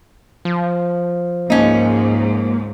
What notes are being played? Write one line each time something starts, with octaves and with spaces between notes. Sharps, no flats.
F3
C#2 G#2 A#3 C#4 D#4